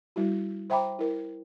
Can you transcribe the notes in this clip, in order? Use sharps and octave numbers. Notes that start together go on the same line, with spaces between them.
G3 E4 F#4
C5 E5 G5 A#5 B5 D6
E4 A#4